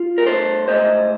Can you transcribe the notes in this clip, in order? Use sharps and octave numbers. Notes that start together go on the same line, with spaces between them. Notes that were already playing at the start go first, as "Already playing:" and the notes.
Already playing: F4
A#4
A2 A4 C5
A2 C5 D#5